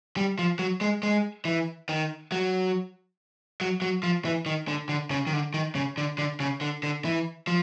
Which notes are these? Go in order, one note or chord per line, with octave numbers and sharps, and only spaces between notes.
G3
F3
F#3
G#3
G#3
E3
D#3
F#3
F#3
F#3
F3
E3
D#3
D3
D3
C#3
D#3
D3
D#3
C#3
D3
D3
C#3
D3
D3
E3
F3